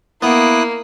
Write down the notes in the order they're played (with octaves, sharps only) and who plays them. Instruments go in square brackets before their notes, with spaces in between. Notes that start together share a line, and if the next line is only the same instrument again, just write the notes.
[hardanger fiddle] A#3 [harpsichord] B3 [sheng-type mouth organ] E4 D#6 F#6